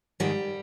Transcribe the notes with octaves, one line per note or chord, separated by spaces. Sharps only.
G#2 D#3 G3